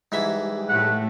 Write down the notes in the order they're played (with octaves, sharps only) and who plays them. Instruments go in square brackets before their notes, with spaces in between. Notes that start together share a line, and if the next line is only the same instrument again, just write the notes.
[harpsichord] G#2 E3 E5 [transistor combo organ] G3 G#3
[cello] A2 A3 [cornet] F#5